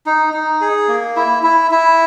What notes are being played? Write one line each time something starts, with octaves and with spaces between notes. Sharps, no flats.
D#4
D#4
G#4
A#3
E4
E4
E4